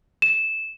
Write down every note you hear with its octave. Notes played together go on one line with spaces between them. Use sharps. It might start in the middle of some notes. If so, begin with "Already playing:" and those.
E7